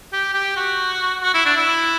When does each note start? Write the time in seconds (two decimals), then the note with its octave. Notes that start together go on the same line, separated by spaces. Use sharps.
0.13 G4
0.34 G4
0.57 F#4
1.23 F#4
1.34 E4
1.45 D4
1.57 E4